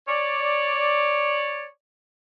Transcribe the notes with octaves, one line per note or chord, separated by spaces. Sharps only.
C#5 D5